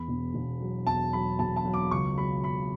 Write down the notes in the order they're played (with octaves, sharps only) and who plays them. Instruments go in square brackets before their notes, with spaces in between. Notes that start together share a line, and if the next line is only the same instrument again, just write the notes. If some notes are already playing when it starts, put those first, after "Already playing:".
Already playing: [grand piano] E2 B5
E1
E1
F#3
E2 A5
F#3 B5
E1 A5
A5
F#3
D6
C#2 C#6
F#3 B5
C#2 B5